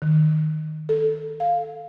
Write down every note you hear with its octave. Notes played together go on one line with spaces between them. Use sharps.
D#3
A4
F5